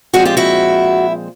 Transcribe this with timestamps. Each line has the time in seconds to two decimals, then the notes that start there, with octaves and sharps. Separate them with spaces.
0.13 A#2 F3 G#3 C4 F#4 G#4
0.25 F4 G4
0.37 E4 F#4